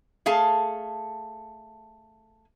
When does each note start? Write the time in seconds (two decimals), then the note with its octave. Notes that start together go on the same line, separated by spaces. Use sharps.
0.26 A3 G#4 F5 A5